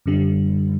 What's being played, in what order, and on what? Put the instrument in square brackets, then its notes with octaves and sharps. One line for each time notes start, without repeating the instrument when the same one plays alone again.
[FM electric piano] F#2 D3 G3